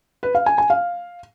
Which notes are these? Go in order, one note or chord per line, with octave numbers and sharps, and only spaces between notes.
B4
F5
G#5
G#5
F5